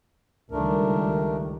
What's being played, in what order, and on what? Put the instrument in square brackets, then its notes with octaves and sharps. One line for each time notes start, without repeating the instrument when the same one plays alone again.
[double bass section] C#2 D#3 G3 [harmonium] A3 D4 A#4